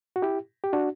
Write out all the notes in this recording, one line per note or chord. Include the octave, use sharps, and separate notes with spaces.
F#4
E4 G4
G4
D4 F#4